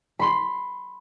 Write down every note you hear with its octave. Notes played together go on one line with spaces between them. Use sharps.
B5 C6